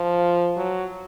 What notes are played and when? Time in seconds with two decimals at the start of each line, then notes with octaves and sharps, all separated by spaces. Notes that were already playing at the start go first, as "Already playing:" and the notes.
Already playing: F3
0.57 F#3